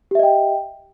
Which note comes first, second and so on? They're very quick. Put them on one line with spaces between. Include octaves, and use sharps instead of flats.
G4 E5 D#5 G5